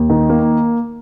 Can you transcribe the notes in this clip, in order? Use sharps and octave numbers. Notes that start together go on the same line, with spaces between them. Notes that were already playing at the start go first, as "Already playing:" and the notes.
Already playing: D#2
D#3
A#3